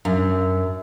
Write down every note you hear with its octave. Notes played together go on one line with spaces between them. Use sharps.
F#2